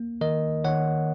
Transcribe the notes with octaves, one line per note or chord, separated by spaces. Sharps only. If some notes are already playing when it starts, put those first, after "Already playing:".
Already playing: A#3
D#3 A#4 D#5
D#3 C#5 F#5